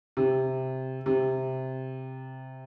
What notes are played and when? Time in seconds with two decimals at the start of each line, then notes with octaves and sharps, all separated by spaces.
0.17 C3
1.06 C3